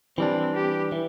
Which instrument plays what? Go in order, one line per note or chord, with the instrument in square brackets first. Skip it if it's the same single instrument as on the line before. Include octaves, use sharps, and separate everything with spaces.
[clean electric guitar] E3 G3 D4 [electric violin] C4
[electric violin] G4
[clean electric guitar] E3